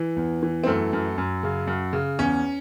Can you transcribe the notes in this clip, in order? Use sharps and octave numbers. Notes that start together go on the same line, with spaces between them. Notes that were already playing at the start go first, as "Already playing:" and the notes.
Already playing: E3
E2
E3
C4
F#2 A3
F#2
F#2
C#3
F#2
C#3
E2 C#4